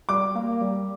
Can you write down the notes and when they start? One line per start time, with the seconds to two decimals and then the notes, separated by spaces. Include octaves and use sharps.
0.09 G3 D6
0.35 A#3
0.61 G3